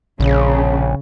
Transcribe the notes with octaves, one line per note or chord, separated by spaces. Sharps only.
A#1 C#3